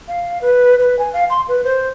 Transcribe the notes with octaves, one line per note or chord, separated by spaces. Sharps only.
F5
B4
B4
G#5
F5
C6
B4
C5